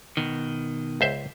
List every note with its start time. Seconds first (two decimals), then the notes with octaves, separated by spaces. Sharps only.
0.17 B2 D#3
1.01 C#2 C5 E5